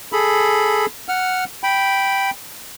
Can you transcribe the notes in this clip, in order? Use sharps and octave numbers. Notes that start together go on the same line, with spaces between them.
G#4 A4 B5
F#5 F6
G5 B5